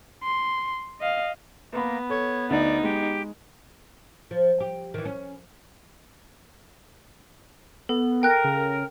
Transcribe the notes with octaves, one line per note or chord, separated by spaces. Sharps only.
C6
D#5 F5
A#3 B3 B4 B5
A4 C#5
D2 D#4 D5
G#3 G4
F3
G4
D#3 E3
C#4
B3 A4
A#4 G5 F#6
C#3